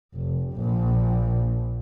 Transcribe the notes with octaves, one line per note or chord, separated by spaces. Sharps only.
F1
A#1